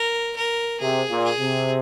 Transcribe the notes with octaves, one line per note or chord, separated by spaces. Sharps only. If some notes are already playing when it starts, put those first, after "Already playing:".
Already playing: A#4
A#4
C3 G#4
A#2
G#4
C3